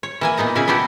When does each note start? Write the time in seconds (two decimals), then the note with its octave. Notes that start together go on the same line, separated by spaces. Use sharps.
0.03 C#5
0.21 E3 A#3 G#5
0.37 A#2 B3 D#4 A#5
0.55 A#2 C#3 E4 F5 G#5
0.68 B3 D4 E4 F#4 G4